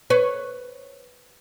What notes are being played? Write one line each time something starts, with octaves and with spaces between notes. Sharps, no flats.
B4 C#5